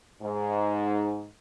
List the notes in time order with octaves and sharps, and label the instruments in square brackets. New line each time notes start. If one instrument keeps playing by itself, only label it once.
[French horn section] G#2